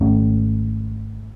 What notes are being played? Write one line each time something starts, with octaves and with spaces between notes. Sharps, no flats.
G#1 A3 C#4